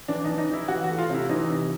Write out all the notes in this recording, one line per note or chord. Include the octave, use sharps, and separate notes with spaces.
E3 D4
E3 D#4
D#4
E3 E4
E3 F#4
F#4
A3
F4
C3 E4
E3 D#4
C3